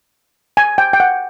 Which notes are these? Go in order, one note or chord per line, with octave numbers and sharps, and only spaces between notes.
G#5
G5
G5
F#5